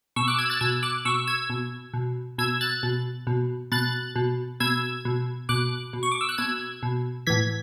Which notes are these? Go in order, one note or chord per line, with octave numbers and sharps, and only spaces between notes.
B2 C#6 E6
D6 F#6
E6 G#6
F#6 A6
B2 E6 G#6
D6 F#6
B2 C#6 E6
E6 G#6
B2
B2
B2 E6 G#6
F#6 A6
B2
B2
B2 F#6 A6
B2
B2 E6 G#6
B2
B2 D6 F#6
B2
C#6
D6
E6
F#6
B2 E6 G#6
B2
A2 E3 G#6 B6